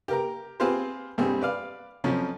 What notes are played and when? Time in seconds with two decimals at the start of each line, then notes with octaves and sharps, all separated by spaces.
0.08 G4 A#4 A#5
0.60 C4 F4 G4 G#4 B4 C5
1.18 B1 G2 G3 C4 G#4
1.41 B4 D5 F5
2.04 F2 F3 F#3 C#4